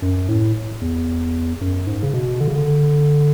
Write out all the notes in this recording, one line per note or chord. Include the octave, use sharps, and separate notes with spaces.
F#2
A2
E2
F#2
G#2
C#3
B2
D3
C#3
D3